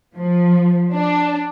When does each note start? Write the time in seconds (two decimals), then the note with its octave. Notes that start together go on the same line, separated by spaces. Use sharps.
0.16 F3
0.93 D4